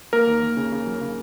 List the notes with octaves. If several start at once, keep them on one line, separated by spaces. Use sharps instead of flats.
A#3 A#4
D#2
D#2
C#3
C#3
F#3
C#3